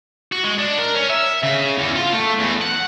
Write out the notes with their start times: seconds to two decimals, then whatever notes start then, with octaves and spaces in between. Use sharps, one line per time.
0.32 F#4
0.44 G#3
0.58 D4
0.78 A#4
0.95 C#4
1.10 E5
1.43 C#3
1.78 E2
1.95 F4
2.13 A3
2.39 E2
2.61 F#5